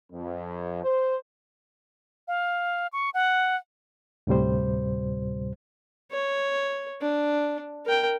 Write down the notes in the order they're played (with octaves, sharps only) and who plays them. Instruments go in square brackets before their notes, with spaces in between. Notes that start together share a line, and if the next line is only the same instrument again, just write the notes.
[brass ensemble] F2
C5
[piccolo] F5
C#6
F#5
[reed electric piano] D2 A2 C3 G3 C5
[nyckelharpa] C#5
D4
A#4 G5